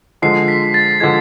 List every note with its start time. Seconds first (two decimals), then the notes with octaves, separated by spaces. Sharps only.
0.22 D3 F3 G#3 C7
0.48 B6
0.74 A6
1.00 D3 F3 G#3 G#6